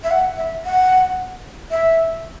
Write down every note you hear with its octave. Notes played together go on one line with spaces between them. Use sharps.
E5
F#5
E5
F#5
E5